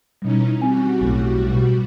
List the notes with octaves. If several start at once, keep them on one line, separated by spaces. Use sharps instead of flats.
B2 E3 G3 C#4 D#4
G3 C4 F#4 G#5
B1 A2
B2